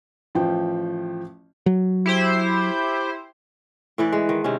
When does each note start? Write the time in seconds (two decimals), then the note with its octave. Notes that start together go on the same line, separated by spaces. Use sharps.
0.35 A1 F3 F4 G5
1.66 F#3
2.06 E4 G4 C5
3.98 A2 E3 B4 D5
4.12 G#3
4.29 D#3
4.44 C3 D#3 C#4